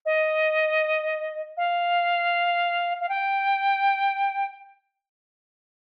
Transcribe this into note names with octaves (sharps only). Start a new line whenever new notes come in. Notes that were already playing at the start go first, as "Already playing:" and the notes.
D#5
F5
F5
G5